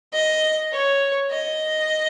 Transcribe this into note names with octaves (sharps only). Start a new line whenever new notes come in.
D#5
C#5
D#5